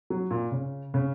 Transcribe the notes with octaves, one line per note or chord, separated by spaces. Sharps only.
F#3
A#2
C#3
C#3